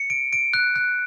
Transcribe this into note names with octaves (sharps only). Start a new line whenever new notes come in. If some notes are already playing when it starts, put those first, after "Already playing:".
Already playing: C#7
D7
D7
F#6
F#6